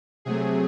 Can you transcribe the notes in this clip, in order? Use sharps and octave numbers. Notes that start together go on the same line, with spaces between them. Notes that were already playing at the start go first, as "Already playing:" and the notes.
C3 F#3 A3 G#4